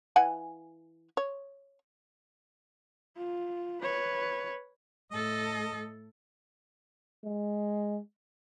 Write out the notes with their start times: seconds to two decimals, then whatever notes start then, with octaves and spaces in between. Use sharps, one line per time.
0.16 E3 F#5 G#5
1.17 C#5
3.17 F4
3.82 B4 C#5
5.11 A2 A4 D#5
7.25 G#3